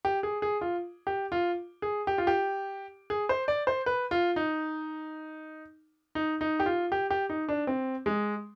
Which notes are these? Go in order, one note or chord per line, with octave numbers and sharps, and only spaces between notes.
G4
G#4
G#4
F4
G4
F4
G#4
G4
F4
G4
G#4
C5
D5
C5
B4
F4
D#4
D#4
D#4
G4
F4
G4
G4
D#4
D4
C4
G#3